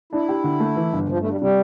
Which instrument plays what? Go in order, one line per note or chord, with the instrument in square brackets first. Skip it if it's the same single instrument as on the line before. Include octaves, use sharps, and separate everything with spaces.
[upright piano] D4 [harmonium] E4
[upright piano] G4
D3
A3
E3
G1
[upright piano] G1 [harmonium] F3
[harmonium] A3
[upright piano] G2
[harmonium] G3
[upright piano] C3 [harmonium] G3